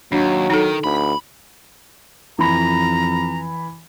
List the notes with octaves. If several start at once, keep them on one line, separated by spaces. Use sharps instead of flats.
D#2 F#3 D4
D#3 D#4 A4
D2 B5
F2 E3 A#5 B5